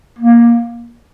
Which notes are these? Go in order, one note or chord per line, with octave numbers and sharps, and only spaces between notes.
A#3